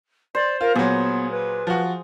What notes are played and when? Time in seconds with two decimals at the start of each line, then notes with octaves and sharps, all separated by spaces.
0.35 C5 D5
0.61 F4 A#4
0.76 A#2 F#3 B3 G#4
1.31 B4
1.67 F3 F#4